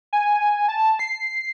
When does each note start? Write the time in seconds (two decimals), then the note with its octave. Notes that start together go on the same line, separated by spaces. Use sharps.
0.13 G#5
0.69 A5
0.99 C7